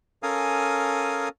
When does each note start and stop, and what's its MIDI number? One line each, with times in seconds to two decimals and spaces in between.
0.23 1.29 61
0.23 1.29 69
0.23 1.29 70
0.23 1.29 77
0.23 1.29 80
0.23 1.29 87